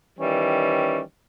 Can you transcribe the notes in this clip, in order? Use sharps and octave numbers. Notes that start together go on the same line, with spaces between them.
D#3 E3 G3 C#4